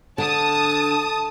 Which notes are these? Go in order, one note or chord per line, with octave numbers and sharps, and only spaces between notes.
D3 A5 D#6